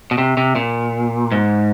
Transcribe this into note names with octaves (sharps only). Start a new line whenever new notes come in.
B2
C3
C3
A#2
G#2